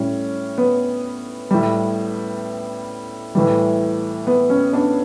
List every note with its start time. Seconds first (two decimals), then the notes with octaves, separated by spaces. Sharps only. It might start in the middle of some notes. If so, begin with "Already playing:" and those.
Already playing: A2 G3 C#4
0.58 B3
1.51 A2 G3
3.35 A2 E3 G3
4.27 B3
4.50 C#4
4.73 B3 D4